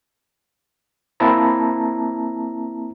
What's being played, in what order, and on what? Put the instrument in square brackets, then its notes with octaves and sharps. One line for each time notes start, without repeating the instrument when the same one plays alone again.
[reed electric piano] A#3 C4 E4 E5 A5 A#5